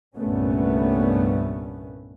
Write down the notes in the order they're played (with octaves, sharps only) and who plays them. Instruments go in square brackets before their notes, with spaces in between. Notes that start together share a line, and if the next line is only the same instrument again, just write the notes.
[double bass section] C2 G2 A#2 A3 B3 C#4